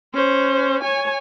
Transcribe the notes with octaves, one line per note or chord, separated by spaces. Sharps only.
C#4 C5
C#5 G#5